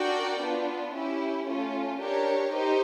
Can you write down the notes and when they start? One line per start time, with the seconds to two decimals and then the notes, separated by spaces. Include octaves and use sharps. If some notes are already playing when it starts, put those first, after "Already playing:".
Already playing: D4 F#4 A#4 D5 G5
0.40 B3 D4 F4
0.93 C#4 E4 G4
1.46 A3 C#4 F4
1.99 D4 G4 A#4 C#5
2.53 D#4 G4 C5